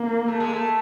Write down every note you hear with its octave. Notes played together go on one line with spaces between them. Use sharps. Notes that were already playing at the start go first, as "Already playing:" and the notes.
Already playing: A#3
A3
G#3
A3